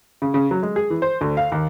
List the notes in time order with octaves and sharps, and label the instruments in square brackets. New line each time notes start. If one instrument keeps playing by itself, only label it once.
[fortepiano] C#3
C#3
F#3
G#3
G#4
E3
C5
D2
F5
D#2